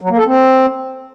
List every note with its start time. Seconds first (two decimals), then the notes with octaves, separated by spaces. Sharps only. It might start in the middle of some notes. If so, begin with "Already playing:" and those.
0.01 F#3
0.09 A#3
0.18 A4
0.26 C4